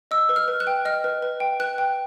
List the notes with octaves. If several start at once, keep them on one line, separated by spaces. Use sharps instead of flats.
D#5 E6
B4
F6
B4
F#6
G5
D#5 F6
B4
B4
G5
B4 F#6
G5